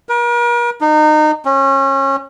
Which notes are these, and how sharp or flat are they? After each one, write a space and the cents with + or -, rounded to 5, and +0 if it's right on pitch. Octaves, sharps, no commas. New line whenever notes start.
A#4 +45
D#4 -30
C#4 -30